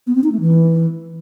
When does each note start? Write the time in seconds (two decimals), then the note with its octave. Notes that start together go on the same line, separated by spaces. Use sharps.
0.07 B3
0.15 C4
0.24 D#4
0.32 A3
0.40 E3